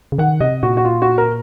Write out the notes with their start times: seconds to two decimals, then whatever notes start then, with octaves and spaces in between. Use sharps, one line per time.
0.12 C#3
0.18 D#3 F#5
0.41 C3 D#5
0.63 A#2 F#4
0.77 F#4
0.85 F4
1.02 F#4
1.18 A#4